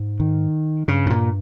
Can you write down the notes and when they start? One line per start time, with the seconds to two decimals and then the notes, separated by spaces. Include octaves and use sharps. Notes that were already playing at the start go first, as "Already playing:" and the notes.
Already playing: G#2
0.20 D#3
0.88 G2 C#3
1.06 G#2
1.10 A#2